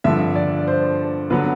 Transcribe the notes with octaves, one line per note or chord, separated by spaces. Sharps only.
G2 D3 F3 E5
D5
C5
D3 F#3 B3 B4